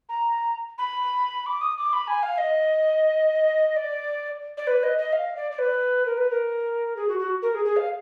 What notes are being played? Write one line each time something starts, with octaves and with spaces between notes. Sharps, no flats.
A#5
B5
D6
D#6
D6
B5
G#5
F5
D#5
D5
D5
B4
D#5
D#5
F5
D5
D5
B4
A#4
B4
A#4
G#4
F#4
F#4
A#4
G#4
G#4
F5